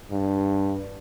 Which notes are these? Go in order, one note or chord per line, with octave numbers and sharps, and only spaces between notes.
G2